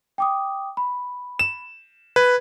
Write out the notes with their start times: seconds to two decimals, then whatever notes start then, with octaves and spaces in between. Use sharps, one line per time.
0.18 G5 D6 D#6
0.77 B5
1.39 E7
2.16 B4 G#6